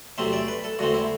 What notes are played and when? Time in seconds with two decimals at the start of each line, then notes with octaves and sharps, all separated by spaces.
0.18 E2 C3 F#3 A3 C4 E5
0.33 D5
0.48 B4
0.64 A4
0.79 E2 D3 A3 C4 F#4
0.94 E4